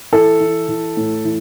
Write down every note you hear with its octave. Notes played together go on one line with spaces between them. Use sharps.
E3 A4
E3
E3
A2
E3